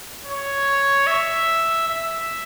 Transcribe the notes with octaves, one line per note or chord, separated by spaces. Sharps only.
C#5
E5
E5